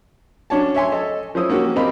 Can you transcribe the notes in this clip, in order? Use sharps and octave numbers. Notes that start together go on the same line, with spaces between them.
C#4 D4 F#4 C#5 A5
C#5 E5 G#5 C6
A4 D#5
F3 C#4 E4 C5 D#6 E6
A#3 C#4 F#4 G4
C4 G4 A#4 D#5 F5 B5